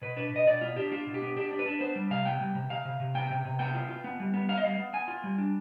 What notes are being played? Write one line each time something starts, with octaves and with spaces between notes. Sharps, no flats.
B2 B4
D4 B4
B2 D#5
B2 D5
B3 F4
D4 G4
D4 F4
B2
G4
B3
D4 G4
D4
B4
D4
B3 C5
G3
C3 F5
B3 G5
G3
C3
C3 F5
C3
C3
B3 G5
C3
C3
B3 G5
F4
F4
B3
G3
B3
B3 F5
D#5
G3 F5
B3
B3 G#5
F4
G3
D4